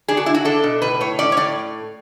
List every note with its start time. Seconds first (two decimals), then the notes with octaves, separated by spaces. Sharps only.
0.08 D4 G#4
0.17 F#4
0.26 D4 E4
0.34 F#4
0.45 D4 A4
0.63 B2
0.82 A2 B4
1.01 A2 C#5
1.19 C#4 D5
1.32 C#5
1.37 A2 D5